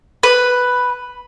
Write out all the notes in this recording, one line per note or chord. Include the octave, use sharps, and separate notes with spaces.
B4